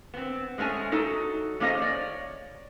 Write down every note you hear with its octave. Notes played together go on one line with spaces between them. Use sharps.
B3 C4
G#3 A3 C#4 A4 G#5
F#3 D#4 A4
A3 A#3 C#4 G#4 C5 D#5
C#5 D5